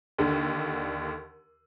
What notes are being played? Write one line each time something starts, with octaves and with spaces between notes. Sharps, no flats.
D#2 D3